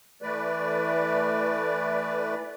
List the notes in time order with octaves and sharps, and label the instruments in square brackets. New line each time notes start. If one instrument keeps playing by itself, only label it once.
[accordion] E3 A3 B4 D5